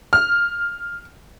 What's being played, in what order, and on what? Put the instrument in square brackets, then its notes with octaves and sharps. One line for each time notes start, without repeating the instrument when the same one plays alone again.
[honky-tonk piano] F6